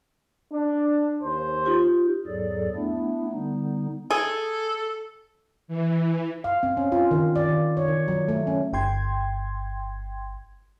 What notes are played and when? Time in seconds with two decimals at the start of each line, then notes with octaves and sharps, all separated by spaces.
0.52 D4
1.22 D#2 C5
1.65 D#4 F4 G4
2.26 E2 G#2 F#3 G#4 A4 D5
2.75 A3 B3 D4 E4
3.32 D3 G3 B3 D#4
4.11 G#4 A4
5.68 E3
6.44 F5
6.63 C4
6.77 C#4
6.92 F4
7.11 D#3
7.36 D5
7.49 D#3
7.77 C#5
7.88 D#3
8.08 F#3
8.28 A3
8.47 C#4
8.73 G1 G5 C6 G#6